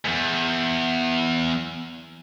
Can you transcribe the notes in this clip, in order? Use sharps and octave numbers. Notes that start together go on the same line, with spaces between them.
E2 G#2